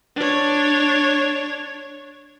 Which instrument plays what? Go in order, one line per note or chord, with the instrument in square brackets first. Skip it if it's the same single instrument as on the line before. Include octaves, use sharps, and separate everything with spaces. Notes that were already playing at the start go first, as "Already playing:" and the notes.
[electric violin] D4 C#5